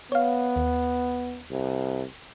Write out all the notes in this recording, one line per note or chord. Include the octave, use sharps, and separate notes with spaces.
B3 C#5 F5
D#2
C2